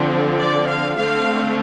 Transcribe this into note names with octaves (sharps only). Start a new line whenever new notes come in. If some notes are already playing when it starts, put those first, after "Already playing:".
Already playing: D3 F3 C4
D5
F5
D3 A3 C4 F5